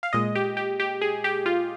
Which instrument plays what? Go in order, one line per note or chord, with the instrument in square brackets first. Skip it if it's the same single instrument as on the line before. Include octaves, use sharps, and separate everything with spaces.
[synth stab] F5
A#2 G#3 D#5
G4
G4
G4
G#4
G4
F4